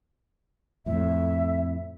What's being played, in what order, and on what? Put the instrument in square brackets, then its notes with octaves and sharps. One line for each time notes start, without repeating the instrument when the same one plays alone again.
[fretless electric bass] F2 A2 [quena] E5